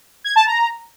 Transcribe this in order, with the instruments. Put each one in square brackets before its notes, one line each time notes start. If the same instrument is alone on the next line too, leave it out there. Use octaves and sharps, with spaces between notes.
[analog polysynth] G#6
A5
A#5